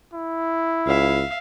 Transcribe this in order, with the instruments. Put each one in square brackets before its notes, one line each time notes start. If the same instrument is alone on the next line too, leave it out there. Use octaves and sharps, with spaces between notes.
[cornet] E4
[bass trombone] C#2 [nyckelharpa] E5 F5